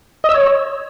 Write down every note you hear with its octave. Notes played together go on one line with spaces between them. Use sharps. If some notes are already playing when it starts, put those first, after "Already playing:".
D#5
E6
C#5